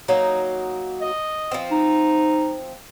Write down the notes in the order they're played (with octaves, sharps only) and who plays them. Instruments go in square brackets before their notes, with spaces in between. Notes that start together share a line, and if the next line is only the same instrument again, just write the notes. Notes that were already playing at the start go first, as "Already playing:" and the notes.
[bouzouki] F#3 A#3 D#4
[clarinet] D#5
[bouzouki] F3 C4
[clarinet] D#4